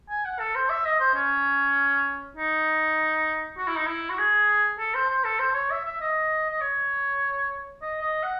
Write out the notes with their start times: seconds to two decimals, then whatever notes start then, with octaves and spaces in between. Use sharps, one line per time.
0.09 G#5
0.25 F#5
0.39 A4
0.55 C5
0.70 E5
0.85 D#5
1.00 C5
1.15 C#4
2.37 D#4
3.58 F#4
3.67 E4
3.77 D#4
3.87 E4
4.10 F#4
4.18 G#4
4.79 A4
4.94 C5
5.10 C5
5.24 A4
5.39 C5
5.54 C#5
5.70 E5
5.85 E5
6.01 D#5
6.50 D#5
6.61 C#5
7.82 D#5
8.02 D#5
8.23 F#5